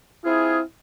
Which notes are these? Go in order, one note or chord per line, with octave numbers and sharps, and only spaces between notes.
C4 E4 F4 G#4